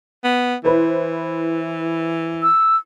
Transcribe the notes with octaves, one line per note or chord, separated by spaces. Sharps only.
B3
E3 E4 B4 C5
E6